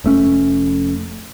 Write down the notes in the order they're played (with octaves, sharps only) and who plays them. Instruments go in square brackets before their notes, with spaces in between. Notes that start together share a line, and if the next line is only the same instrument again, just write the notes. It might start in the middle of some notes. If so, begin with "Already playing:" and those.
[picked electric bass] F1 A3 C#4